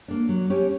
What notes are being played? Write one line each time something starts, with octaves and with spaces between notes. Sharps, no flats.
A#3 D4
F#3
C#4 G4 C#5